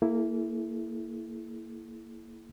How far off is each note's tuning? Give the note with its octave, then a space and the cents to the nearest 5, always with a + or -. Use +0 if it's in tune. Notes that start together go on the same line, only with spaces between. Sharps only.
A#3 -10 E4 +0 G#4 +45